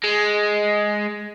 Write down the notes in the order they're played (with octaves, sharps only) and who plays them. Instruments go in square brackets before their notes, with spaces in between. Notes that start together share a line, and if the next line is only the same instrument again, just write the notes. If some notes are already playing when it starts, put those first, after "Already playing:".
[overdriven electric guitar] G#3